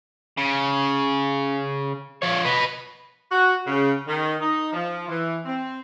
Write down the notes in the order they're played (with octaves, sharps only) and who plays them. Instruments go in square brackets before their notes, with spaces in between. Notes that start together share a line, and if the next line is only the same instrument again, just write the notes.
[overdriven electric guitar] C#3
F3 C#5
B4 D#5
[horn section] F#4
C#3
D#3
D#4
F3
E3
C4